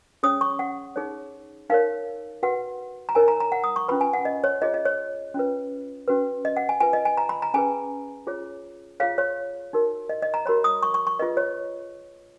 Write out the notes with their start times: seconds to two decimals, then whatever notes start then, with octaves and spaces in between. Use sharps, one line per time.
0.23 C#4 G#4 C#5 D#6
0.41 C#6
0.59 F#5
0.96 D#4 G#4 C#5
1.69 D#4 A#4 C#5 F5
2.43 F#4 B4 F#5
3.09 A#5
3.15 D#4 A#4 C#5 G#5
3.28 A#5
3.40 A#5
3.52 F#5
3.64 D#6
3.76 C#6
3.88 C#4 F4 B4 B5
4.01 G#5
4.13 F#5
4.25 D#5
4.44 C#5
4.62 F4 G#4 C#5 D#5
4.74 D#5
4.85 C#5
5.34 C#4 F4 B4
6.08 C#4 F#4 B4
6.45 D#5
6.57 F#5
6.69 G#5
6.80 F4 B4 G#5
6.93 D#5
7.05 G#5
7.17 A#5
7.29 B5
7.42 A#5
7.54 C#4 G#4 B4 G#5
8.27 F4 G#4 C#5
9.00 F4 G#4 C#5 F5
9.18 C#5
9.73 D#4 F#4 A#4
10.09 D#5
10.22 D#5
10.34 A#5
10.46 F#4 A#4 C#5 B5
10.64 D#6
10.83 C#6
10.94 C#6
11.07 C#6
11.19 F4 G#4 B4 D#5
11.37 C#5